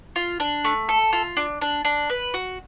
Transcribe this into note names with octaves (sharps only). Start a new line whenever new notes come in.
F4
D4
A3
A4
F4
D4
D4
D4
B4
F#4